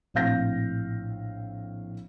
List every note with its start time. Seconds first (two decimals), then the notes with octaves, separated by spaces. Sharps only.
0.14 A#1 A2 C4 F5 G6 A#6